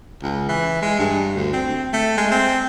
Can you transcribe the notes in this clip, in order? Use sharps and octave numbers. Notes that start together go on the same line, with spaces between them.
C#2
E3
G#3
G2
D2
C4
A3
G#3
C4